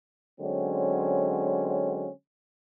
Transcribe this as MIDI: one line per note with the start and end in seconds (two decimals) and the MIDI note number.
0.40 2.09 50
0.40 2.09 54
0.40 2.09 56
0.40 2.09 60
0.40 2.09 61